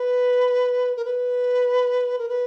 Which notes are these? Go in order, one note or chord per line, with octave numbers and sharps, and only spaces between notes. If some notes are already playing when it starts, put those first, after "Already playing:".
Already playing: B4
A#4
B4
A#4
B4